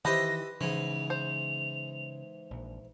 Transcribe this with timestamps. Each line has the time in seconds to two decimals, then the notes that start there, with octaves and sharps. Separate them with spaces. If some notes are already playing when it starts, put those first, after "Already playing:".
0.05 D#3 E3 G4 B4 C5 D#5 E5 A#6
0.61 G#2 C#3 E3 F7
1.10 C5
2.51 A#1